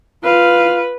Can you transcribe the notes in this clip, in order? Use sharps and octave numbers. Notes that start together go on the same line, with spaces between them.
F4 B4 F5